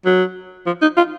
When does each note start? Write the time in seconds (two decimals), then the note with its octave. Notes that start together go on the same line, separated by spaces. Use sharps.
0.06 F#3
0.66 F3
0.82 D#4
0.97 F4